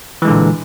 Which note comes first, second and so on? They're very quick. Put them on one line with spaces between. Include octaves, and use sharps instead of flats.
E3 G#3 D3 A#2